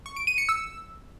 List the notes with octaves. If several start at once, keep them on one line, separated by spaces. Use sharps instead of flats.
C#6
D7
D#7
C#7
E6